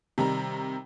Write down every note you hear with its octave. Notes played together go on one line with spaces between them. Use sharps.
C3 D#3 G3 A#5